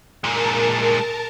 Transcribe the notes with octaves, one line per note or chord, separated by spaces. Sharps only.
A#2 G#3 A#4 A5